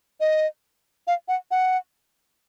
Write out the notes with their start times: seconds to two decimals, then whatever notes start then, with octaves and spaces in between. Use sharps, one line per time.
0.20 D#5
1.07 F5
1.28 F#5
1.51 F#5